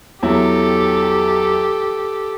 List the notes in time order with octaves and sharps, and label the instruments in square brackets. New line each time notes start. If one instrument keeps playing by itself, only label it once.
[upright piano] E2 F#3 E4 [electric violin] G4 A4